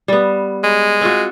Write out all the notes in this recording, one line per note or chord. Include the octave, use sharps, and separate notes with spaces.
G3 B3
G#3
C4 F4 F#4